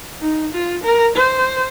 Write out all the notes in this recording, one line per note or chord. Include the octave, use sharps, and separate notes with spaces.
D#4
F4
A#4
C5